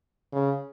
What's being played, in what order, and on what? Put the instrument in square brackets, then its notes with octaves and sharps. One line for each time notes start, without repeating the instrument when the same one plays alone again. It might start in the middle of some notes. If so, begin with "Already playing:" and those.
[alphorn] C#3